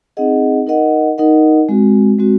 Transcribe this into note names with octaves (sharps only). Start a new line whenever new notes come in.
C4 D#4 G#4 D#5 F#5
D#4 A#4 D#5 F#5
D#4 A#4 D#5 F#5
G#3 C4 F#4
G#3 C4 F#4